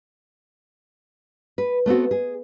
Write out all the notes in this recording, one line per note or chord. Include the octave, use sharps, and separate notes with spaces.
B4
A3 B3 C4 F#4
G#4